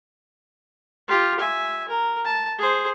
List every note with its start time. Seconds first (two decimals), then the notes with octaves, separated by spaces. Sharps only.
1.08 F4 G4
1.40 E5 G#5
1.88 A#4
2.25 A5
2.59 G#4 C5